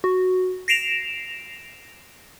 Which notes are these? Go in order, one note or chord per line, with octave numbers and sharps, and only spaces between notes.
F#4
A#6 C7 D7 E7 F7